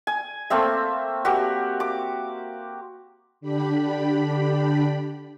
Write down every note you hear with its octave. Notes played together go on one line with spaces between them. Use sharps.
G#5
A3 A#3 C4 E5
F#4 G4 A#4
D6
D3 D4 G4 B5